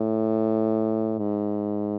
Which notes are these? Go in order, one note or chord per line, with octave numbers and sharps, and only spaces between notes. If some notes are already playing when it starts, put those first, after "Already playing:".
Already playing: A2
G#2